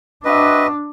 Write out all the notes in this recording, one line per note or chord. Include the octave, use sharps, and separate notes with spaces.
C4 D4 F#4 B4 D#5 E5